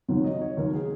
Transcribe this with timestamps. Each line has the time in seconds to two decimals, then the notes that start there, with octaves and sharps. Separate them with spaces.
0.08 D#2 D#3 F#3
0.24 D#5
0.41 C#5
0.57 D#2 D#3 F#3 A#4
0.74 G#4